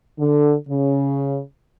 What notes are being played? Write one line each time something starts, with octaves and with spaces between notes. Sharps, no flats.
D3
C#3